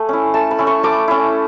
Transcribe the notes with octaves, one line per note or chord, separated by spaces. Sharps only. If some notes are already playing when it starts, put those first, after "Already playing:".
Already playing: A3 G#5
C#4 E4
A3 A5
B5
C#4 E4
C#6
A3 D6
C#4 E4